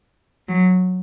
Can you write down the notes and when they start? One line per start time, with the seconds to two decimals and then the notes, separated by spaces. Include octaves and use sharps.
0.48 F#3